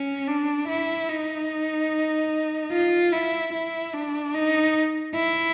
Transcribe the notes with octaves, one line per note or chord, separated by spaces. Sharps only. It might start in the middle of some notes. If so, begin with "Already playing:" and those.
Already playing: C#4
D4
E4
D#4
F4
E4
E4
D4
D#4
E4